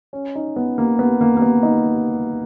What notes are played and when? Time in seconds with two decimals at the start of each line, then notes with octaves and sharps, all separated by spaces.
0.13 C#4
0.35 D#4
0.56 B3
0.78 A#3
0.99 B3
1.21 A#3
1.37 A#3
1.42 B3
1.63 D#4